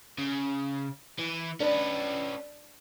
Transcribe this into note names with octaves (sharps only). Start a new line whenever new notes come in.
C#3
E3
C#4 D4 B4